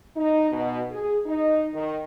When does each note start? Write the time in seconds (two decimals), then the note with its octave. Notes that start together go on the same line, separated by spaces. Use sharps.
0.16 D#4
0.51 B2
0.90 G#4
1.26 D#4
1.74 D#3